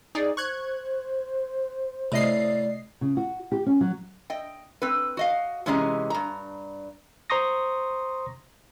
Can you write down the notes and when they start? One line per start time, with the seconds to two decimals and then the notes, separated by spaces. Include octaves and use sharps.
0.15 D#4 G#4 D5
0.37 C5 C#6 F#6 G#6
2.12 A2 C3 D5 D#5 C7
3.01 C#3
3.17 F#4
3.52 G4
3.66 C#4
3.81 F#3
4.30 D#5 G5
4.82 C4 B4
5.17 F#4 D#5 F5
5.66 C3 E3 G#3 C#4 D#5 A#5
6.10 G2 A#5
7.30 C5 A#5 C6 C#6 D#6 A#6